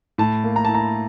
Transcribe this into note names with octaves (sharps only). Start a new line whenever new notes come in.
A2 A5
A#3
A#5
E4 A5
A#5